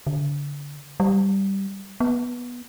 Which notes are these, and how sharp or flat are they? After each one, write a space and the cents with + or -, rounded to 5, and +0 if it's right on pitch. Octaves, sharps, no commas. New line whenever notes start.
D3 -30
G3 -5
B3 -15